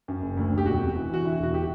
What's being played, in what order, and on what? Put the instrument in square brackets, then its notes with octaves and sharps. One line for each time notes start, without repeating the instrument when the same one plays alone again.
[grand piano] F#2
F#1
D2
D3
G4
E1 F#4
C3
E3
E3 F#4
D3 E4
E1 F#4
G4